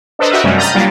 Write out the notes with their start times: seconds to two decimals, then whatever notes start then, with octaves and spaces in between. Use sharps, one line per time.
0.19 D4 A4 B4 C5 D#5 A#5
0.31 F#4 G4 A#4 B4 D#5 E5
0.44 F#2 C3 G3 A3 C#4
0.57 A#5 B5 D#6 F6 G6 A6
0.74 F#3 G3 A#3 D4 F4